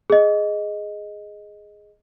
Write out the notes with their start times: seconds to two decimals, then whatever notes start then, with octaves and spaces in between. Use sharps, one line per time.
0.10 G#4 D#5